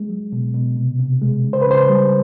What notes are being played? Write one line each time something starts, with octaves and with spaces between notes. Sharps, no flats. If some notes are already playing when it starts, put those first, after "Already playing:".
Already playing: G#3
F#3
B2
B2
C3
C3
G#3
C#3
C5
B4
C#3 C5
G3